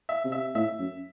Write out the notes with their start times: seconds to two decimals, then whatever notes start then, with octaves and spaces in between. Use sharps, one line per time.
0.09 E5
0.25 C3
0.32 E5
0.55 A2 E5
0.79 F#2